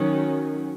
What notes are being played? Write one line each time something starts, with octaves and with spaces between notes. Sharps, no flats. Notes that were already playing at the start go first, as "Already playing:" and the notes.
Already playing: D#3 F#3 C#4